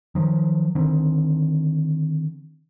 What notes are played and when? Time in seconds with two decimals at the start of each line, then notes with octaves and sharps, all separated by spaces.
0.15 D#3 F3 F#3
0.75 D3 D#3 C4